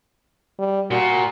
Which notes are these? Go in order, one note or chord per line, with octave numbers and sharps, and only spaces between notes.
G3
A#2 F#4